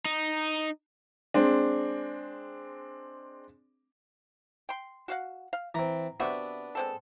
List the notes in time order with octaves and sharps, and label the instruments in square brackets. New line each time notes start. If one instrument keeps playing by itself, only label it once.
[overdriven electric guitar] D#4
[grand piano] G#3 C4 D4
[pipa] G5 C6
F#4 F5 F#5
F5
[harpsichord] E3 C4 [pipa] A#5
[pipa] C3 F#4 E5 [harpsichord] B3 D4
[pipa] G#3 C4 A4